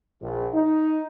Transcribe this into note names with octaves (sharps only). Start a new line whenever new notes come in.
A#1
D#4